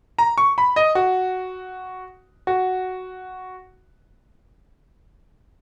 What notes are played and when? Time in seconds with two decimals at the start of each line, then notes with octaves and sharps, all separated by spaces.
0.18 A#5
0.38 C#6
0.58 B5
0.76 D#5
0.95 F#4
2.47 F#4